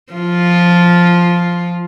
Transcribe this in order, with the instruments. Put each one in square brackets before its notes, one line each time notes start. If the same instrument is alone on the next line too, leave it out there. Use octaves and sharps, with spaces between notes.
[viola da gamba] F3 F4